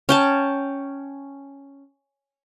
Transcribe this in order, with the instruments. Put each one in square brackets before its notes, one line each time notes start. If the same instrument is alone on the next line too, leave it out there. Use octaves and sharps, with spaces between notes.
[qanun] C#4 G5 A5